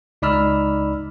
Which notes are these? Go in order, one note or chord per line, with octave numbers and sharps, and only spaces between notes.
C#2 D#4 D5 B5 E6 F6